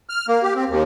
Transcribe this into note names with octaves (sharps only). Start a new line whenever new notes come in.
F6
A#3
G4
C4
D#2